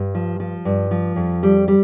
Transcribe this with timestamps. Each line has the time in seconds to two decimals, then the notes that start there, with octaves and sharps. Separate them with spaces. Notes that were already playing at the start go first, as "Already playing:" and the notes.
Already playing: G2
0.14 F3
0.40 F3
0.65 G2
0.91 F3
1.16 F2
1.43 G3
1.68 G3